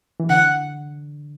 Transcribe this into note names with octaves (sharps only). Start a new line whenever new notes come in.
E3
D3 F#5